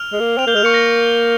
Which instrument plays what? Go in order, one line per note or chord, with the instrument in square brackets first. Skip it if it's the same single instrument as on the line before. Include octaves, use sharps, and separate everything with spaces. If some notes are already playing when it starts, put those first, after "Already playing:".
Already playing: [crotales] F6 F7
[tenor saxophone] G#3
A#3
[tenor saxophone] C4 [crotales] F6 F7
[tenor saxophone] A#3 [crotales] G6 G7
[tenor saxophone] G#3 [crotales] F6 F7
[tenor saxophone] A#3 [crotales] C#6 C#7
[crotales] A#6